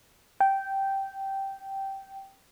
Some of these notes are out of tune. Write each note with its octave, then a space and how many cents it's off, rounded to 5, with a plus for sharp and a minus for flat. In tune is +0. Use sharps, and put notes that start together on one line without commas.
G5 -10